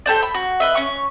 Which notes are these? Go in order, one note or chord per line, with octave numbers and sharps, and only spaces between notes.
G4 A4 C5 D5
B5
F#4
B4 D#5 E5
C#4 C#6